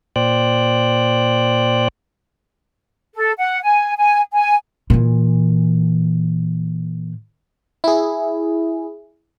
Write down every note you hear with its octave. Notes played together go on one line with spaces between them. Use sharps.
A#2 C5 D5 G5 F#6
A4
F#5
G#5
G#5
G#5
A#2 E3
E4 G#4